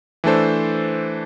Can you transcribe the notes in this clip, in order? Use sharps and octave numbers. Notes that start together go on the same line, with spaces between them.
E3 A3 D4 A4 C5